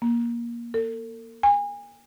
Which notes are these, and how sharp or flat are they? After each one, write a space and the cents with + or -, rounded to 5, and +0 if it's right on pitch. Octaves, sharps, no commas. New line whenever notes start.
A#3 +20
A4 +45
G#5 -30